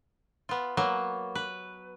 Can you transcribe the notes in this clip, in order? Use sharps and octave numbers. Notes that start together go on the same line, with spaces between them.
B3 F4
F#3 A#3 B3
B4